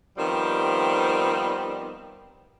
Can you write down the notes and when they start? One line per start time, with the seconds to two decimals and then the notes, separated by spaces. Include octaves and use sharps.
0.17 D#3 F3 G3 B3 C4